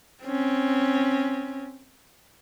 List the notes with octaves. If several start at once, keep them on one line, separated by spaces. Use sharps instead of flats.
C4 C#4